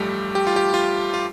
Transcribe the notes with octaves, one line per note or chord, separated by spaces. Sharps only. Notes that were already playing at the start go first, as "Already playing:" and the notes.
Already playing: A1 G2 F3 G3 A3 G4
G4
F4
G4
F4
F4